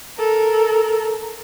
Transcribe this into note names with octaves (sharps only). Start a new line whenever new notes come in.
A4 A#4